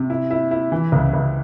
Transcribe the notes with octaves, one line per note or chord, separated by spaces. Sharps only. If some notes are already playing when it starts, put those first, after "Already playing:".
Already playing: C3
E4
E4
E4
E3
C#2
C#2